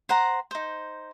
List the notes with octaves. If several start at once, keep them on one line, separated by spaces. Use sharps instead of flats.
C5 F#5 A#5
D#4 C5